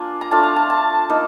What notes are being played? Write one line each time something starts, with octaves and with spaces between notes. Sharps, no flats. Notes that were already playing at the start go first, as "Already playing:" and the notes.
Already playing: A#3 D4 F4 G#5
A#5
A3 D4 F4 A5
A#5
A5
A5
A#3 D#4